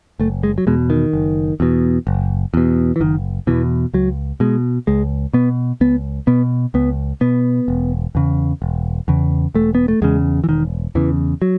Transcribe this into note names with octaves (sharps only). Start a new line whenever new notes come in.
F#1 A3
G#3
F#3
E2 B2 G#3
D#3
F#1
E2 B2
F#1
E2 B2
E3
F#1 D#3
E2 B2 E3
C#2 F#3
B2 G#3
C#2 G#3
B2 B3
C#2 B3
B2 B3
C#2 B3
B2 B3
E1
E2 C#3
E1
E2 C#3
E1 A3
B3
A3
E2 C#3 G#3
E3
E1 D#3
E2 C#3 E3
F#3